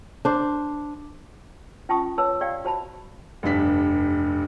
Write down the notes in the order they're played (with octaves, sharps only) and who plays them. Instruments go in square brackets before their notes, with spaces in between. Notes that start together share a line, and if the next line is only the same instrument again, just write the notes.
[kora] D4 C5
[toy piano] C#4 F4 G5 A5 C#6 D#6
B4 C#5 A5 E6
G4 D5 F5 G5
F#4 C5 A5 B5
[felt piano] F1 G2 D4 B6